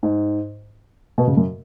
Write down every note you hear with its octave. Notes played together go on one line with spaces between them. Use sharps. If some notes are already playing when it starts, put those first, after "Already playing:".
G#2
B2
C#3
F#2